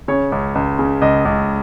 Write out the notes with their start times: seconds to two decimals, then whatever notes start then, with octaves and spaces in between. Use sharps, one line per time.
0.08 C#3 C#5
0.32 C#2
0.55 C#2
0.79 C#3
1.02 C#2 D#5
1.25 C#2